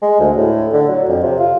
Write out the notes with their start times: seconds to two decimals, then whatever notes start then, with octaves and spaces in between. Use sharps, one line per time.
0.02 G#3
0.20 D2
0.37 A2
0.73 D3
0.89 F#3
1.08 F2
1.23 C3
1.40 F4